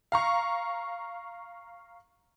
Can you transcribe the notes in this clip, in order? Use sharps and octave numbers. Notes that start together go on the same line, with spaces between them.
F5 A#5 C#6